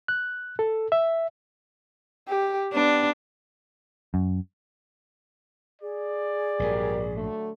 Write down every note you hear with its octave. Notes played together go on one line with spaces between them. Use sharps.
F#6
A4
E5
G4
B3 D4
F#2
G#4 D5
A#1 G#2 F#3 G3 A#4
D3 F#3 A3